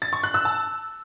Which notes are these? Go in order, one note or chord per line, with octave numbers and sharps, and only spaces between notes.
A6
C#6
F#6
E6
A5